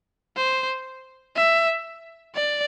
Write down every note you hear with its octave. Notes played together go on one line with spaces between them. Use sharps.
C5
E5
D5